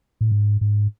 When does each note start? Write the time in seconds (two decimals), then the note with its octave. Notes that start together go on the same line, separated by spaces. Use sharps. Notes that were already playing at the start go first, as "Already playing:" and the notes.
0.21 A2
0.32 G#2
0.61 G#2